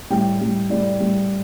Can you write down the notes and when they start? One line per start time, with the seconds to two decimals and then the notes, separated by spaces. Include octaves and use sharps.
0.10 A2 G3 G5
0.41 A2 G3
0.70 A2 G3 D5
1.00 A2 G3